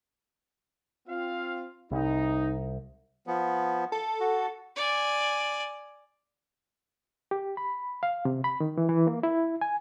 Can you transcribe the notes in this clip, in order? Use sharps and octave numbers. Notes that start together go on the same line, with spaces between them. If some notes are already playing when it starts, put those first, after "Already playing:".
C4 F4 F5
C2 D#4
F3 B3
A4
F#4
D5 G#5
G4
B5
F5
C3
B5
D#3
E3
E3
A#3
E4
G#5